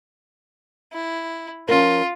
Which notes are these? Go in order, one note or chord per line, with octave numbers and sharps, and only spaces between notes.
E4
F3 C#4 F4 A#4